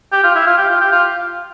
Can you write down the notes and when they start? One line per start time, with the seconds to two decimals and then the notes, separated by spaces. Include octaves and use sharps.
0.12 G4
0.24 F4
0.35 E4
0.46 F4
0.58 G4
0.69 F4
0.81 G4
0.92 F4